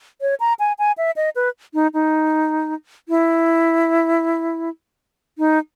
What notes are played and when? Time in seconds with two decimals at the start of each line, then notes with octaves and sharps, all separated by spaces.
0.21 C#5
0.40 A#5
0.59 G#5
0.79 G#5
0.98 E5
1.16 D#5
1.36 B4
1.74 D#4
1.94 D#4
3.09 E4
5.38 D#4